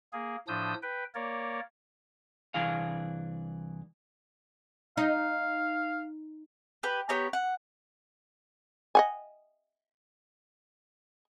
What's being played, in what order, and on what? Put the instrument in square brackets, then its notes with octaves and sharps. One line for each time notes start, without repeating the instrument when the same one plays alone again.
[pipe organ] A#3 G#4
A2 F3 D4 D#6 E6 G6
B4 G5
A#3 A#4 C#5 D5
[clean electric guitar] C2 E3 D4 G#4 F5
[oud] D#4 [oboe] F5
[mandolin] G4 B4
B3 G4 C#5 A#5
F#5
[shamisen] D#5 F#5 G#5